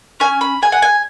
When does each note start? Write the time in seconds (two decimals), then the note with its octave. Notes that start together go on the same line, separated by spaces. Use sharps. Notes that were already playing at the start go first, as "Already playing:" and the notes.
0.20 C#4 G#5
0.41 B5
0.62 G#4 G#5
0.72 F#5
0.82 G#5